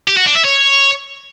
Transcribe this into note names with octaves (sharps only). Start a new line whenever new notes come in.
G4
F#4
D4
E5
C#5